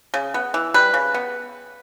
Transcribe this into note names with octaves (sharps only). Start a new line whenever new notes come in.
C#3
B3
E3
G3 B4
C#3
B3